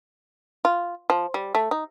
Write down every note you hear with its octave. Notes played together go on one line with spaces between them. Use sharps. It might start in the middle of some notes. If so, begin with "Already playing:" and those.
F4
F3
G3
A3
D#4